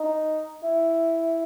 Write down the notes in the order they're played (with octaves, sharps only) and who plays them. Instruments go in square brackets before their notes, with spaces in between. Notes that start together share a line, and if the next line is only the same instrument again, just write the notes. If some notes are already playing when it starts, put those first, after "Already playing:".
Already playing: [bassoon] D#4
E4